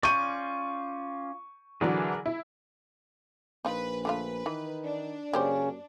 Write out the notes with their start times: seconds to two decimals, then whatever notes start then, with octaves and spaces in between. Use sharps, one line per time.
0.03 C#4 F4 D5 C#6 G6 D#7
1.81 D3 E3 F#3 G#4 A#4 D5
2.26 E4
3.65 A#1 D#4 F4 B4
4.05 D3 A3 F4 B4
4.46 D#3 E3
4.84 D4
5.33 F#2 C#3 A#3 C#4 G4 C5